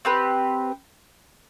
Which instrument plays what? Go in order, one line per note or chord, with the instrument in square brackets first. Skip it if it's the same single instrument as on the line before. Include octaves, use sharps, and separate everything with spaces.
[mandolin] C4 G4 B4